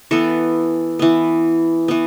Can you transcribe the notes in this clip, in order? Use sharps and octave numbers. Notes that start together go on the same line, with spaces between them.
E3 B3 A4
E3 B3
E3 B3